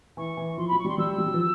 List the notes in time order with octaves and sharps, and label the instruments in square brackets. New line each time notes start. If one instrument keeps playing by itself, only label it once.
[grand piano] E3 [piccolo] C#6
[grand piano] E3
[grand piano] F3 [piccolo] C6
[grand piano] F#3 [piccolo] B5
[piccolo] C#6
[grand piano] G3 [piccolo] C6
[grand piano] G3 [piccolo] E6
[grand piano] G3
F#3
F3